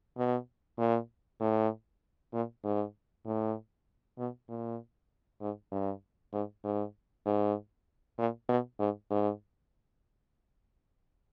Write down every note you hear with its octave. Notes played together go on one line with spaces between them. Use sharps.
B2
A#2
A2
A#2
G#2
A2
B2
A#2
G#2
G2
G#2
G#2
G#2
A#2
B2
G#2
G#2